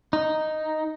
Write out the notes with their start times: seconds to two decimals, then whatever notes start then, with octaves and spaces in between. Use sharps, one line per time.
0.13 D#4